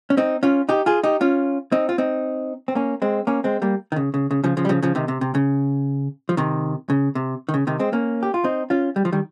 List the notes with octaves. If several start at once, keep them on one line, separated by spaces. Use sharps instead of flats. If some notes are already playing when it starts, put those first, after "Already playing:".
C#4
C4 D#4
C#4 F4
D#4 G4
F4 G#4
D#4 G4
C#4 F4
C4 D#4
F4
C4 D#4
C4
A#3 C#4
G#3 C4
A#3 C#4
G#3 C4
G3 A#3
D#3
C#3
C#3
C#3
C#3 F3
C#3 F3
G3
C#3 F3
C#3 F3
C3 D#3
C3
C3
C#3
F3
C3 D#3
C#3
C3
D#3
C#3
C3 D#3
G#3 C4
A#3 C#4
G4
F4
C4 D#4
C#4 F4
G3
F3
D#3 G3